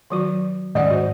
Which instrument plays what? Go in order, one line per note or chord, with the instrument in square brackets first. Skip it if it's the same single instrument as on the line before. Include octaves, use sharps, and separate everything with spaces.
[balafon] D#3 F#3 F#4
[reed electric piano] D#2 G#2 D#5 [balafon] C#4 D5 F#5
[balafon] F#4 C5